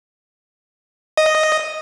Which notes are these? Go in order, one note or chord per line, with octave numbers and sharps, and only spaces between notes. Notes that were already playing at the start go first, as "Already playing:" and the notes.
D#5